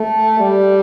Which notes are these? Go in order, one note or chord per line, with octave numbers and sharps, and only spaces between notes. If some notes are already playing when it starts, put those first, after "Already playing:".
Already playing: A3
G3